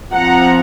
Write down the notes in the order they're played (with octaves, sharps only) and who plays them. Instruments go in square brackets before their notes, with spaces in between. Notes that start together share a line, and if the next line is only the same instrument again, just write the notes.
[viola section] F3 C4 F#5 A#5